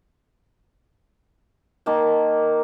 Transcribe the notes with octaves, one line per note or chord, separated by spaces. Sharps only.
D#3 A#3 A5